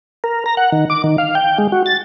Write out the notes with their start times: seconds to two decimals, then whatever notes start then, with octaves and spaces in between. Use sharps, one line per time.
0.24 A#4
0.46 A#5
0.57 F#5
0.72 D#3
0.90 D6
1.04 D#3
1.18 F5
1.35 G5
1.58 G#3
1.72 F#4
1.86 A6